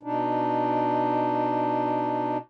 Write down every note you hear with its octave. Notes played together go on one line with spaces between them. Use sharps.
B2 D4 D#4